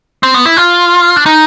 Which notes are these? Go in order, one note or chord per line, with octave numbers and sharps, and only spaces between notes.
C4
B3
E4
F4
D4
D#4